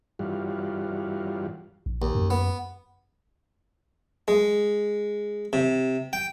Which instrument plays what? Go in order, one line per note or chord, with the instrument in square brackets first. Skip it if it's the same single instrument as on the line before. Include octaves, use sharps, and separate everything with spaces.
[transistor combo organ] G2 E3 G3 F4 F#4
[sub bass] A#1
[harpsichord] D#2
[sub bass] F#2
[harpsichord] B3
G#3
C3
G5